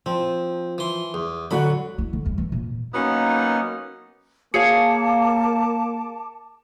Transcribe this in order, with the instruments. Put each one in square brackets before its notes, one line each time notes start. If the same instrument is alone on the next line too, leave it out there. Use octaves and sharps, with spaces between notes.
[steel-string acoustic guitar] F3 [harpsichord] C4
[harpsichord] E3 C6
E2
[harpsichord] D3 B5 [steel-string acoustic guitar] F#3 F#4 F#5
[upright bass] E4
D3
E2 G3
E3
A#2
[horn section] F#3 A#3 B3 C#4 D#4
[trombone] A#3 [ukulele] G#4 C#5 F5 [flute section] A5 D6 [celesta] C#7